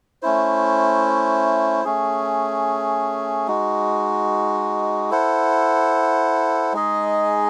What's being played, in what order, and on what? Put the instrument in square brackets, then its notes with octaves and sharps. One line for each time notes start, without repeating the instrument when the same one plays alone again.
[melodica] A3 C#4 E4 C5
A3 C#4 G#4
G#3 D#4 F#4
E4 A4 C5 F#5
G#3 D#4 G#4 D#5